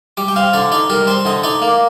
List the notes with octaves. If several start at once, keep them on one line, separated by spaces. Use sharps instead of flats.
G3 D6
G5
C4 F5
D3 D5
D#4 D5
G3 A#4
C4 C5
D3 D#5
D#4 D5
A#3